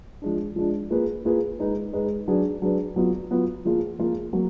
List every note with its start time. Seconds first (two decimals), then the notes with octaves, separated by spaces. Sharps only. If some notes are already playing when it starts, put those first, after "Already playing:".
0.22 F3 G#3 D4
0.56 F3 G#3 D4
0.90 A#3 F4 G#4 B4
1.25 A#3 F4 G#4 B4
1.59 G#3 D#4 G#4 B4
1.93 G#3 D#4 G#4 B4
2.28 F#3 D4 G#4 B4
2.62 F#3 D4 G#4 B4
2.96 F#3 B3 F4
3.31 F#3 B3 F4
3.65 F3 A#3 F4 G#4
3.99 F3 A#3 F4 G#4
4.33 F#3 A#3